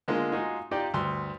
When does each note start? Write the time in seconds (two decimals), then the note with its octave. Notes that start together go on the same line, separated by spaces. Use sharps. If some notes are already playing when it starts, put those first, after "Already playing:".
0.08 D3 G#3 A#3 F4
0.32 G#3 D#4 F4 F#4 G#4
0.71 D#4 F4 G4 D5 D#5 G5
0.94 D2 G2 C6